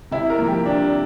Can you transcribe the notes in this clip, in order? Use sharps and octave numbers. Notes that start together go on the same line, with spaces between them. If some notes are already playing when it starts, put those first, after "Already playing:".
C3 E4
A#4
F3 A#3
G4
C3 D4